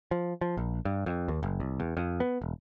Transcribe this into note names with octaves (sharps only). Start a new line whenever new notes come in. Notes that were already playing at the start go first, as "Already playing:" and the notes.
F3
F3
A#1
G2
F2
D#2
F#1
C2
E2
F2
B3
E1